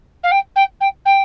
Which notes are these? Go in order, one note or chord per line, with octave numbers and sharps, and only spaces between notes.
F5
G5
G5
G5
G5